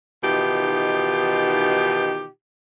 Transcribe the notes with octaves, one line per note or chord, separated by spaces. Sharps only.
B2 D#3 E3 D#4 F4 G4